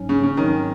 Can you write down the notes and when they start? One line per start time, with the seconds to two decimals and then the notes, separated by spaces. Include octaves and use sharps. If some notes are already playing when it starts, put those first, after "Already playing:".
Already playing: G#2 F#3 C#4
0.09 C#3
0.23 C#3
0.37 G#2 D#3 F#3 C4 D#4